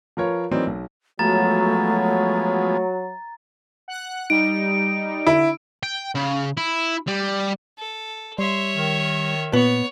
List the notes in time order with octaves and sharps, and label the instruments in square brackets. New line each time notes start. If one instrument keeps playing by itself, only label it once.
[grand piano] F3 F4 A#4 B4 C#5
E3 F#3 C4 D#4 A#4 D5
B1
[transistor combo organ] F3 G#3 B3 [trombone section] F#3 [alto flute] A3 [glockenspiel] A#5 A6
[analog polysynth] F#5 F#6
[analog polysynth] G3 D#4 [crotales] D7
[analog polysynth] D3 [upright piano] E4
[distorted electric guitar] G5
C#3
E4
G3
[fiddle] A4
[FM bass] G3 [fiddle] C#5 E5 [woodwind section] C6
[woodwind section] D#3
[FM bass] A#2 [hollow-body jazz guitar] B3 [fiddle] C#5